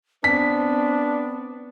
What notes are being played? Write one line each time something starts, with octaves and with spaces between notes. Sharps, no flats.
B3 C4 D4 B6